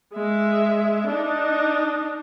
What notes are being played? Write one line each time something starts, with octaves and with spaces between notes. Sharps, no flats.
G#3 E5
D4 D#4